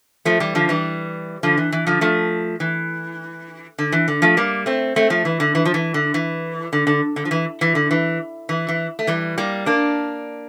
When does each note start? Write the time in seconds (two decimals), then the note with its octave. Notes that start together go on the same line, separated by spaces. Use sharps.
0.25 F3 A3
0.40 E3 G3
0.55 D3 F3
0.69 E3 G3
1.43 D3 F3
1.58 E3
1.72 E3
1.87 D3 F3
2.01 F3 A3
2.60 E3
3.78 D3
3.92 E3
4.08 D3
4.22 F3 A3
4.37 G3 A#3
4.66 A3 C4
4.96 A3 C4
5.10 F3 A3
5.25 E3
5.40 D3
5.55 E3
5.65 F3
5.74 E3
5.94 D3
6.14 E3
6.73 D3
6.87 D3
7.16 D3
7.25 F3
7.31 E3
7.61 E3
7.75 D3
7.91 E3
8.49 E3
8.68 E3
8.99 A3
9.07 E3 G3
9.38 G3 A#3
9.66 A#3 D4